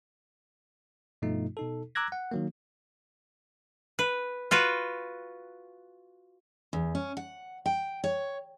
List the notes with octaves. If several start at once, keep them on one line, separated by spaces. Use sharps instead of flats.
G2 B2 F3 A3 D#4 F4
B2 D#4 A4
A#5 D6 E6 F#6 G#6 A#6
F#5
D#3 F#3 A#3
B4
F4 F#4 B4
E2
C#4
F#5
G5
C#5